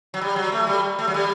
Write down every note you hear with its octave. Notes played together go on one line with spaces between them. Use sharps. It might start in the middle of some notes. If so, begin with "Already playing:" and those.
F#3
G3
F#3
A3
G3
A3
F#3
G3